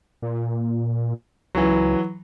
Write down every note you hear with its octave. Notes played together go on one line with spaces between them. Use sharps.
A#2
C#2 E3 F#3